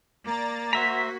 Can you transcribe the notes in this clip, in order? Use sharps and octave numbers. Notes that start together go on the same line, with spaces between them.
A#3 D5 A#5 A6
F#4 C5 E5 A#5 B6